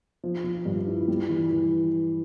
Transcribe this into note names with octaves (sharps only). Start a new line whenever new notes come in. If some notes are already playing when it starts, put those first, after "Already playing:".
F3
F3
G2
E4
G3
E3
E3